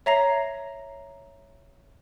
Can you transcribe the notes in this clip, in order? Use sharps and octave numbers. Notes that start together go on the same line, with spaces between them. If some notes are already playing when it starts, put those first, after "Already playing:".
C#5 E5 A#5 A#6 C7